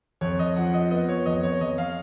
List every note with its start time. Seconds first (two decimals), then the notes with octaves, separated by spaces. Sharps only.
0.21 F2 C#5
0.39 D#5
0.56 F3 F#5
0.74 D#5
0.91 B3 D#5
1.09 C#5
1.26 F2 D#5
1.43 C#5
1.61 F2 D#5
1.78 F5